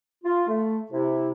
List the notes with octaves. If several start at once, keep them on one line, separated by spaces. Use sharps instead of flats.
F4
A3
C3 E4